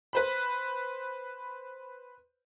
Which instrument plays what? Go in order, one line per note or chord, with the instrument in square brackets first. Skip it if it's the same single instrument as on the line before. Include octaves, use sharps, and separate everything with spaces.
[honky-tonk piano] B4 C5 B5